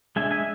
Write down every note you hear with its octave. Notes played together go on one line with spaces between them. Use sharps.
G#3 D4 E5 G#5
E5 G#5